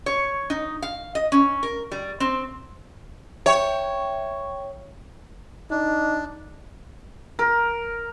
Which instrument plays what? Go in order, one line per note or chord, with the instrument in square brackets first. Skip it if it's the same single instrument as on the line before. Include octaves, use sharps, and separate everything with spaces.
[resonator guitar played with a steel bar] C#5
D#4
F5
D#5
C#4
A#4
G3
C4
[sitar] C#5 [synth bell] E5 G5 C#6
[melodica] D4 [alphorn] D#4
[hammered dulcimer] A#4